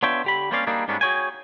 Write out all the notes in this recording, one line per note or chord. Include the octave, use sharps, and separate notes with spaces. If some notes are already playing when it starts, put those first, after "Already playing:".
B3 D4 F4 C#5 E5 G5
D3 G4 B5
G3 A#3 C4 C#4 D5 F5
G3 A#3 D4 D#4 G#4
G#2 G3 A#3 B3 C#4 D4
F#4 G#4 C#5 G5 G#5